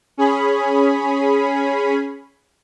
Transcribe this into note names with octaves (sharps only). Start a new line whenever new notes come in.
C#4 G#4 B5